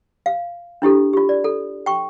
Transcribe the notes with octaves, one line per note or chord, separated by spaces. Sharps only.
F5
D4 E4 G4 A4
F4 G4
D5
A4
G5 C#6